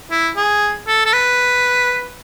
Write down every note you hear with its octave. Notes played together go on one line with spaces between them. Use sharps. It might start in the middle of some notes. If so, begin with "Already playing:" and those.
E4
G#4
A4
A4
B4